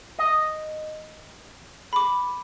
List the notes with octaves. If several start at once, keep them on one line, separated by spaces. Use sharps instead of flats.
D#5
B5 D6